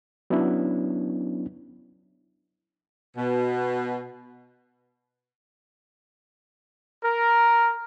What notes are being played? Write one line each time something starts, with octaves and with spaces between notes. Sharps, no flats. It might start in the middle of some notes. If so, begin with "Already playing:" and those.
F#3 B3 C#4 D4 E4
B2
A#4